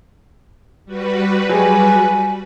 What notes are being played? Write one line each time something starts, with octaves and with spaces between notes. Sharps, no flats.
G3 F#4 B4
F#3 G#3 G4 G#5